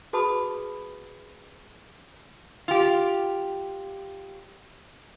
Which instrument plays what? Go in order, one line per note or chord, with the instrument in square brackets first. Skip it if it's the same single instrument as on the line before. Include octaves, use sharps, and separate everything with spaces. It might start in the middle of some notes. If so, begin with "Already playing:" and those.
[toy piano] F#4 G#4 B4 A5 B5 D#6
[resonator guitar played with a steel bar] F4 G4